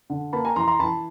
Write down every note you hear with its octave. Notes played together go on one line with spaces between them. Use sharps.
D3
A#3 A5 B5
G#5 A#5
E3 A#5 C6
A#5 C6
E3 A5 B5